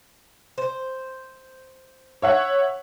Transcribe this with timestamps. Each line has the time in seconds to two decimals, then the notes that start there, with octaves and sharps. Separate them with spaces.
0.58 C5
2.22 C#5 E5 F#5